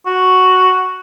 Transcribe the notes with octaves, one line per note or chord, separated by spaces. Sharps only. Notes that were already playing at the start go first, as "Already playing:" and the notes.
F#4